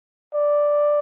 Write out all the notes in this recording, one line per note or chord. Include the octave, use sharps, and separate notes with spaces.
D5